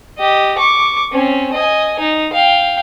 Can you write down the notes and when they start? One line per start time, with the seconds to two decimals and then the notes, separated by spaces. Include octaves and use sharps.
0.18 G4 D#5
0.58 C#6 D6
1.12 C4 C#4
1.53 D#5 G#5
1.99 D#4
2.33 F5 G5